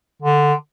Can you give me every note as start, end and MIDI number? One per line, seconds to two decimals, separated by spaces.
0.22 0.54 50